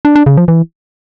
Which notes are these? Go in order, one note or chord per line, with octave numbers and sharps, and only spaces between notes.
D4
D4
C#3
F3
E3